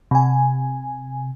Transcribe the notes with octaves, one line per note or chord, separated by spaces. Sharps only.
C3 G#5